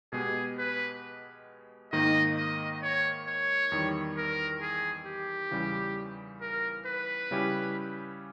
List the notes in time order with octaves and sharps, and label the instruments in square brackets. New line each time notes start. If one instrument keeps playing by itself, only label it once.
[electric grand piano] B2 G#3 B3 G4 [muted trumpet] G#4
[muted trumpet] B4
[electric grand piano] G#2 D#3 A#3 D#4 [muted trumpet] D#5
[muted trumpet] D#5
C#5
C#5
[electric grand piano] E2 D#3 G3
[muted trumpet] A#4
G#4
G4
[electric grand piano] E2 C#3 E3 G3
[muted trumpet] A#4
B4
[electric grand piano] C#3 G3 C#4 E4 G4